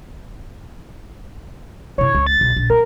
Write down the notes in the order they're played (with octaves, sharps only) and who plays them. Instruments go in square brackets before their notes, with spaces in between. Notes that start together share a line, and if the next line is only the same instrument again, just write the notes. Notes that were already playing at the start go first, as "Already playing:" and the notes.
[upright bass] C3 E4 [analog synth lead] C#5
[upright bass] C#2
[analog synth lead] A6
[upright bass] B1
A#1
[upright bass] A#3 [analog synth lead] A#4